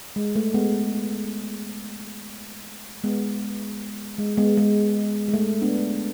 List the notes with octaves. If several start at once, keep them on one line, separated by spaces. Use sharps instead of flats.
G#3
A3
G#3 B3
G#3 B3
G#3
G#3 B3
G#3
G#3
A3
B3 D4